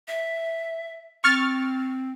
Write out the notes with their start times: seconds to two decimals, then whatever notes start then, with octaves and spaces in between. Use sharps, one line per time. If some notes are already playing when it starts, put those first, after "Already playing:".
0.08 E5
1.24 C4 C#6 F6 A6